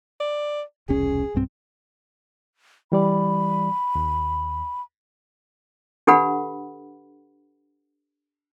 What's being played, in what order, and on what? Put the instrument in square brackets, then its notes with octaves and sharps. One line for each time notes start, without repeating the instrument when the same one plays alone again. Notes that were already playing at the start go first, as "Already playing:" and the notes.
[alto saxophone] D5
[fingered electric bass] E1 C2 C#4 [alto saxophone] G#4
[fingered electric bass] B1 G2 C4
[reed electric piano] E3 G3 D5 [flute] B5
[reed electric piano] D#2
[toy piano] D4 G4 A4 B4 F#5 B5